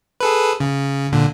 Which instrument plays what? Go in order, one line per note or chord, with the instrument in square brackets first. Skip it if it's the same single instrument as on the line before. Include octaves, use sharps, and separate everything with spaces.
[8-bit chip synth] G#4 A4 B4
C#3
A#2 D3